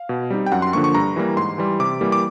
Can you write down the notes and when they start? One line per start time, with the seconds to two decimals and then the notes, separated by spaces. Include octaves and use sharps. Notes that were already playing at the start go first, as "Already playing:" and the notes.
Already playing: F5
0.09 B2
0.30 G3 C4 D#4
0.46 G5
0.52 F#2 F#5
0.62 C6
0.73 D3 F3 A#3 D4 C#6
0.84 C#6
0.94 G2 A#5
1.16 E3 G3 A#3
1.37 G#2 C6
1.58 E3 G3
1.80 C3 D6
2.01 E3 G3 A#3
2.12 D6